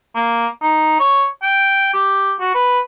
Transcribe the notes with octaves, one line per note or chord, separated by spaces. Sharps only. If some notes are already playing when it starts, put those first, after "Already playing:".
A#3
D#4
C#5
G5
G4
F#4
B4